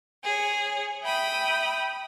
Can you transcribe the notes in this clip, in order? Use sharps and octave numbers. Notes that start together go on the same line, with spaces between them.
G#4 C#5
E5 G5 B5 D#6